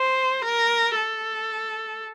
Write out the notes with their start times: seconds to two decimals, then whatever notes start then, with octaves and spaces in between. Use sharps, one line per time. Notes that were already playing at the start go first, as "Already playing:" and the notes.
Already playing: C5
0.44 A#4
0.96 A4